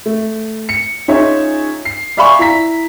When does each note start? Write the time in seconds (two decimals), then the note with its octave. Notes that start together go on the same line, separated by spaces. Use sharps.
0.06 A3
0.69 C#7
1.08 C#4 D#4 F4 G#4 C#5 E5
1.85 C7
2.17 D5 E5 F5 G#5 B5 C#6
2.39 E4 A#5 B6